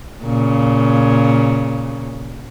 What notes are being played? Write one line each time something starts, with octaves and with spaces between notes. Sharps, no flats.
A#2 C#3